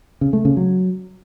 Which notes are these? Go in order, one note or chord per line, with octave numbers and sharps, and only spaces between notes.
C#3
A3
C#3
F#3